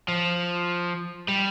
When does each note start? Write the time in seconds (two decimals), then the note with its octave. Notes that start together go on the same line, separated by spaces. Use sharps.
0.08 F3
1.28 G3